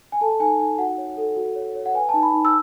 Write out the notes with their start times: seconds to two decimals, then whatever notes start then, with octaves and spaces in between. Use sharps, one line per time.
0.12 G#5
0.21 A4 A5
0.40 D#4 G#5
0.59 D#4 G#5
0.78 F#4 F#5
0.98 C#5
1.17 A4
1.36 F#4
1.56 C#5
1.75 C#5
1.86 F#5
1.94 B4 G#5
2.09 D#4 A5
2.23 B5
2.34 D#4
2.45 E6